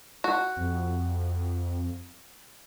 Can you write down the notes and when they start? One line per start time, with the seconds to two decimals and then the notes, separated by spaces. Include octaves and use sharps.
0.24 F#4
0.57 F2